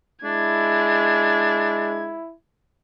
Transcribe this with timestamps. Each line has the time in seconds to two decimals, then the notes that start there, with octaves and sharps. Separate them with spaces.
0.24 G#3 D4 E4 G#6